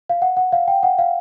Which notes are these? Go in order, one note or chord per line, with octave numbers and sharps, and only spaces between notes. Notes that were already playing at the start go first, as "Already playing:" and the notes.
F5
F#5
F#5
F5
G5
F#5
F5